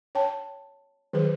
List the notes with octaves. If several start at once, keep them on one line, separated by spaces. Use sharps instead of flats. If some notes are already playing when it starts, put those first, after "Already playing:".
C#5 G5 A5
D#3 F#3 G#4 B4